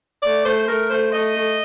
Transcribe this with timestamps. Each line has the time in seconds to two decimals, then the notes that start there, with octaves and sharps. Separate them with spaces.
0.22 A3 D5
0.44 A3 C5
0.67 A3 A#4
0.90 A3 C5
1.12 A3 D#5
1.35 A3